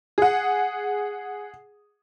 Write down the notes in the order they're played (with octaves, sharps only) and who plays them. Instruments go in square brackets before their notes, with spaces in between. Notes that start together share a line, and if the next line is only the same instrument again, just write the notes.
[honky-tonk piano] G#4 F#5